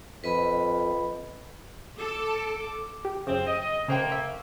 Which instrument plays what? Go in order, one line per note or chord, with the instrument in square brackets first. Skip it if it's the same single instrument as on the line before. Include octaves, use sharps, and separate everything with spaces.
[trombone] F2 [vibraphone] B4 D#5 B5
[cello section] A4 [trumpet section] D6
[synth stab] G4
[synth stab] F#2 C#3 [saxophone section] C4
[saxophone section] D#5
[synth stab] C#3 C5 G5 [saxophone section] A3 A#3
[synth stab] E5